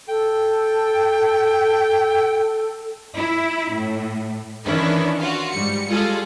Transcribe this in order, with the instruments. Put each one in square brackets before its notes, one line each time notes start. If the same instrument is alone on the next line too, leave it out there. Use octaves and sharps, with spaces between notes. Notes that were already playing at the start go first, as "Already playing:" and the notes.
[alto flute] A4 [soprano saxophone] G5
[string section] E4
A2
D#3 E3 C#4 D4 E4 B4
F4 F#4
G#2 G3 C#7
G3 G#3 F4 G#4 A4